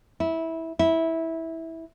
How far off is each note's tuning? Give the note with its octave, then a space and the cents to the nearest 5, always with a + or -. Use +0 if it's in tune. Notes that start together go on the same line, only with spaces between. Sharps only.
E4 -15
E4 -15